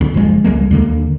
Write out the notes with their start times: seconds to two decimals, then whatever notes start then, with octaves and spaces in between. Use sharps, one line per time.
0.01 D2
0.14 F#1 F3 G#3
0.44 C#2 G3 G#3 A#3
0.71 D#2 D3 A#3